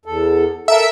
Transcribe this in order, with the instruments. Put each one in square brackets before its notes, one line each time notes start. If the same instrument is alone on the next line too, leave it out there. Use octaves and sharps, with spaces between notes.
[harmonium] E2 A4
[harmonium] A4 A#4 [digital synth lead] E5